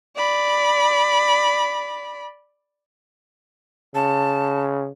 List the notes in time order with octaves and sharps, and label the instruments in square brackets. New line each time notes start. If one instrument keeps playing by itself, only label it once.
[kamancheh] D5 B5
[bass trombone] C#3 [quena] A5